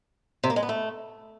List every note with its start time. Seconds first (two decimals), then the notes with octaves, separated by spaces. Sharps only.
0.43 C3
0.50 A#3
0.56 G#3
0.63 B3
0.69 A3